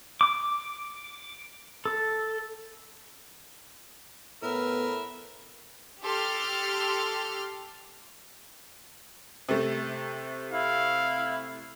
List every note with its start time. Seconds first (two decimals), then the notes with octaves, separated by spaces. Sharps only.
0.21 D6
1.85 A4
4.43 A2 B3 A#4 B4 E5
6.03 G4 A4 C6 F6
9.49 C3 A3
10.52 E4 F5